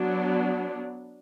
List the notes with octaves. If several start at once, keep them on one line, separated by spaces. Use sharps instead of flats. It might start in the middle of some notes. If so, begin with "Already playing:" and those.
Already playing: F#3 B3 D4